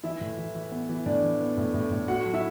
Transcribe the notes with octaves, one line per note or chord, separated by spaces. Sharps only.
E3 E4 E5
A2
E3
E3
B3
E3
A2 D4 D5
E3
B3
A2
A2
A2
A3 F#4 F#5
F#3
E4 E5